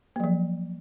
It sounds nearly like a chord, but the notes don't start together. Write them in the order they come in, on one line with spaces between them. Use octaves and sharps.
A#3 F#3 F3